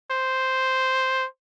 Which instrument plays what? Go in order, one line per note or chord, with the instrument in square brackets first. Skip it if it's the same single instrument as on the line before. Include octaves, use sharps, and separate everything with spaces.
[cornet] C5